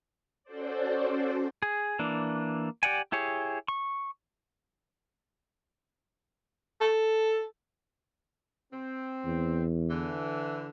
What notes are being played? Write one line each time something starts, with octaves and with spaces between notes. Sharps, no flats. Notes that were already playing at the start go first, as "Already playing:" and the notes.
C#4 F#4 A4 C5 D5
G#4
E3 A#3 D4
G4 D5 F#5 G#5
E4 G4 G#4 C#5
C#6
A4
C4
E2
D3 E3